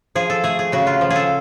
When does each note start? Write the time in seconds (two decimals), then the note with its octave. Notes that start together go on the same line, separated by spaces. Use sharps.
0.15 F3 G#4
0.30 A4
0.44 A3 G#4
0.59 G#4
0.72 C#3 F#4
0.87 F4
1.01 F3
1.10 G#4
1.16 A4